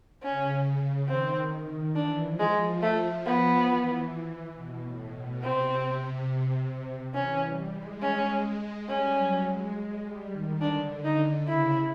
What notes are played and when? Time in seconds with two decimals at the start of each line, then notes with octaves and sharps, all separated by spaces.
0.22 C#3 C#4
1.09 D#3 C4
1.96 E3 D4
2.25 F3
2.39 G#3
2.54 F3
2.82 A3
3.26 B3
3.68 E3
4.55 B2
4.84 A2
5.14 B2
5.42 C3 C4
7.15 E3 C#4
7.44 G3
7.72 G#3
8.02 C#4
8.88 G3 C#4
9.16 F#3
9.46 G#3
9.75 G#3
10.03 G3
10.32 D#3
10.61 D3 D4
11.05 D#4
11.48 C#3 E4